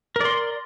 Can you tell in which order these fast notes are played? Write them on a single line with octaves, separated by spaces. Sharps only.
A#4 D5 C6